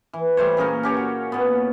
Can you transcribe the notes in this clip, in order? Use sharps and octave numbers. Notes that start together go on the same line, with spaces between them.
E3
G3 A3 C5 C#5
A#2 C#4 G#4 A#4
C#4 G4 C#5
F#4
A#2 B3